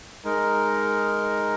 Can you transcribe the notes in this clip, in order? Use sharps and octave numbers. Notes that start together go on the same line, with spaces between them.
G#3 D#4 A#4